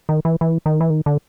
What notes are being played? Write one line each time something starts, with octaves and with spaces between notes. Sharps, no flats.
D#3
E3
E3
D#3
E3
D#3
D3